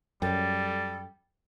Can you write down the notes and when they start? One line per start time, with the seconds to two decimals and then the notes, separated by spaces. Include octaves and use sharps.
0.22 F#2 G3 A4 G5